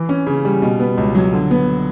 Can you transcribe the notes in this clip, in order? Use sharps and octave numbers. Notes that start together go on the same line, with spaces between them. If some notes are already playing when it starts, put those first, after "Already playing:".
Already playing: E3
C#4
C#3
G3
B2
B3
C#2
F#3
D3
B3